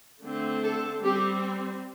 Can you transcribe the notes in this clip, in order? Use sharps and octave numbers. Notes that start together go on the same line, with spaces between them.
D3 A3 C4
A4
G3 C4 G4